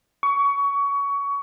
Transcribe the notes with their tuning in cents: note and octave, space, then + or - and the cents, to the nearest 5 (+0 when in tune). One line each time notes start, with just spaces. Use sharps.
C#6 +25